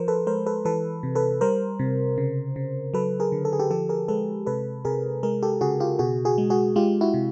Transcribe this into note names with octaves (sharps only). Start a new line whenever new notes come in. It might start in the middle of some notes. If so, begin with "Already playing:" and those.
Already playing: F3 A#4 C5
A4 B4
G#3 A#4 C5
A4 B4
E3 A4 B4
C3
A4 B4
G3 A#4 C5
C3
C#3
C#3
F#3 A4 B4
G#4 A#4
D3
A4
G#4
G4 A4
F3 G4 A4
G#4 A#4
G#3 A4 B4
C3 A4 B4
C3 G#4 A#4
G#3 G#4 A#4
G4 A4
C#3 F#4 G#4
F4 G4
B2 F#4 G#4
F#4 G#4
G#3
F#4 G#4
G#3 F4 G4
E4 F#4
C3